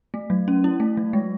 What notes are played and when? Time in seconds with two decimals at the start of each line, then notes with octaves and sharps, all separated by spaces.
0.14 A3
0.30 F#3
0.48 C#4
0.64 E4
0.80 A3
0.97 F#3
1.13 G#3